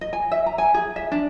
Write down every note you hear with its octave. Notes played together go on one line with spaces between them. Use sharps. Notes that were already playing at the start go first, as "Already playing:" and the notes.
D#5
G#5
E5
A#5
G#5
G#4
E5
D4